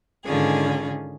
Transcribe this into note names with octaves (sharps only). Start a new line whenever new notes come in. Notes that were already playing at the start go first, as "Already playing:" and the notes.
G#2 D3 D#3 C#4 F4 G#4